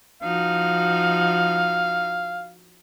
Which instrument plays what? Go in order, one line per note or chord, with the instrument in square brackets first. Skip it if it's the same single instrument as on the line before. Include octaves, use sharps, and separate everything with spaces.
[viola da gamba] F3 D#4 F#4 [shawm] F5